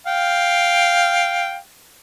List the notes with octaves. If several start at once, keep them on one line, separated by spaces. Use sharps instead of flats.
F5 G5